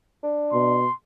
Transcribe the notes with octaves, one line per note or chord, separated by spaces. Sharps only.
D4
B2 C6